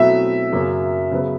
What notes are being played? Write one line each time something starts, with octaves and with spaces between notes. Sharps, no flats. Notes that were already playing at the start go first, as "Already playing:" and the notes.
Already playing: B2 F#3 A3 C4 E4 E5
F#2 C#3 F#3 A#3
C#3 F#3 B3